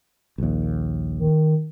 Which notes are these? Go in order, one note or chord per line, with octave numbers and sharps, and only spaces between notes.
A#1 D#2
D#3